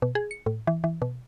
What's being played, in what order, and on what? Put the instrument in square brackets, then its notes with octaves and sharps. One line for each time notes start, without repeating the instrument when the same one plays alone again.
[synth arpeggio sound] B2
G#4
C#7
A2
E3
E3
B2